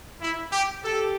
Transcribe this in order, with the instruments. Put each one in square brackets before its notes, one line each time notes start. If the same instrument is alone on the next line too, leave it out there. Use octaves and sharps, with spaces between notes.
[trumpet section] E4
G4
[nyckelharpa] G4 [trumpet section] A4